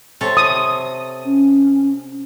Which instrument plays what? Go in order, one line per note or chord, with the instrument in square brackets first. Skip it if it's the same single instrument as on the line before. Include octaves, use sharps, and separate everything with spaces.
[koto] C3 A4 C#5
[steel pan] D#6
[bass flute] C#4